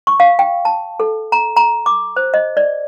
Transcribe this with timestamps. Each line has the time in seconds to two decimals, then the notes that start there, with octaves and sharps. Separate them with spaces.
0.07 C#6
0.20 F5
0.39 G5
0.65 A5
1.00 A4
1.32 A#5
1.56 A#5
1.86 D6
2.16 C5
2.34 D#5
2.57 D5